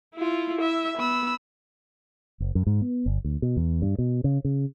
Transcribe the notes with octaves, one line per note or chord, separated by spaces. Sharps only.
E4 F4
E4 E5
B3 B5 E6
F#1
F#2
G#2
B3
G1
D2
B2
E2
G2
B2
C#3
C#3